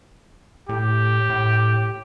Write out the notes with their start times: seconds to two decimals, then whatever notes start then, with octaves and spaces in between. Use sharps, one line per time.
0.69 A2 G4
1.30 A2